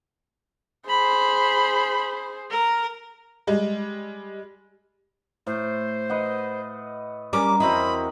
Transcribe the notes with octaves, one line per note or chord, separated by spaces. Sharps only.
G#4 C5 B5
A#4
G3 G#3
A2 C5
B4 D#5 F#5
G3 C#4 A#4 D6
E2 C4 E4 F#4 D#5 B5